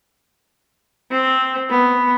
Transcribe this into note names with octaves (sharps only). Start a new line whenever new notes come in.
C4
B3